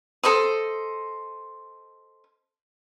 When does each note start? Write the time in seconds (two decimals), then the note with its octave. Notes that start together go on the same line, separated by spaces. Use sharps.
0.23 A4 C5 D#5 D#6